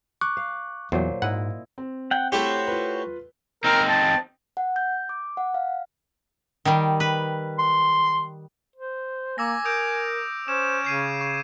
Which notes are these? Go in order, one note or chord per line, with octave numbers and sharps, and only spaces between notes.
C#6 D6 F#6
F5
E2 A#2 F#3 C5
G#2 E4 D#5 F#5
C4
F#5 G5
A3 E4 F#4 G4 C5 C#5
F4 B4
C4 D#4 A#4
A5
F#5
G6
D6
F#5
F5
D#3 G3
B4
C6
C5
A#3 G#5 D6 E6 A#6
A#4 D#6 G6 D7
C#4 C5 E7
C#3 G#6 C7 D#7
C#6